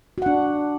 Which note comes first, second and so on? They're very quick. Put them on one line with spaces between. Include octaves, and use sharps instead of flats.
F#4 F#5 D4